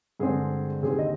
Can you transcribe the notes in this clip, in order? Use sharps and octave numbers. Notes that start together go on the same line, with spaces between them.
G2 D3 G#3 C4 G#4
D#2 D3 G3 C4 G#4
D#5